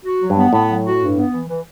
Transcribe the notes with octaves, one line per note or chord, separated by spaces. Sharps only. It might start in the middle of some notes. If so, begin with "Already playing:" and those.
F#4
F#3
G2
B3
A2 B3
F#3
F#4
G2
B3
E3
E3